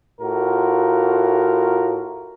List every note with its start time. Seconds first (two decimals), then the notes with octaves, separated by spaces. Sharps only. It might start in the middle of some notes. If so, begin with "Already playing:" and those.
0.21 A2 F4 F#4 A#4